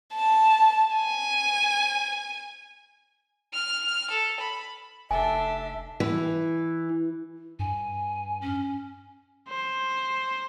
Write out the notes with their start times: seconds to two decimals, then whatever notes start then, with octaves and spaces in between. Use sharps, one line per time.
0.15 A5
0.96 G#5
3.53 F6
4.10 A4
4.40 B5
5.11 F1 D4 A4 E5 G#5
6.00 E3
7.59 G2 G#5
8.41 C#4
9.49 C5